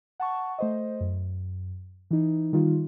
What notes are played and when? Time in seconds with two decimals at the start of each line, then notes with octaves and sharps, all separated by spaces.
0.20 F#5 A5 C#6
0.59 A3 C5 D#5
1.01 F#2
2.11 E3 D#4
2.53 D#3 G3 D#4 F4